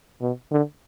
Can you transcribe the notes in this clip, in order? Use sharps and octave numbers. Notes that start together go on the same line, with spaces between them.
B2
D3